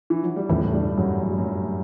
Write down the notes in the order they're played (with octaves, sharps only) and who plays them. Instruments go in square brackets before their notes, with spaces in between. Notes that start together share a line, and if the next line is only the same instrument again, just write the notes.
[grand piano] E3
F#3
G3
[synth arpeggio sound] E2 C#3 E3 [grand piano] A2 A3
[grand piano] G2 G3
F#2 F#3
F#3
G3
F#2 F#3